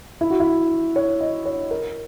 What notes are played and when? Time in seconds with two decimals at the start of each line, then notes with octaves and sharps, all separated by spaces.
0.21 E4
0.30 F#4
0.40 E4
0.96 C#5
1.21 D#5
1.46 C#5
1.71 A#4